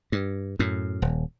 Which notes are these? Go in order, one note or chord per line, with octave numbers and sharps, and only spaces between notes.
G2
F#2 A2
D#1